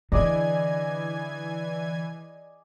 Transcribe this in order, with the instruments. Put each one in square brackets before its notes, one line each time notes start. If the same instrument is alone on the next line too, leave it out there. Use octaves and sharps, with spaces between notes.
[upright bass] D3 [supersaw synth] E3 G#5 G#6 [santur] G#4 D5 D#5